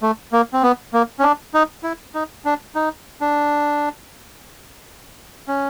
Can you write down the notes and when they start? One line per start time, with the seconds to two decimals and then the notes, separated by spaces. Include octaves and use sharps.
0.02 A3
0.33 A#3
0.53 C4
0.63 B3
0.93 A#3
1.19 C#4
1.23 D4
1.54 D#4
1.84 E4
2.14 D#4
2.45 D4
2.75 D#4
3.21 D4
5.48 C#4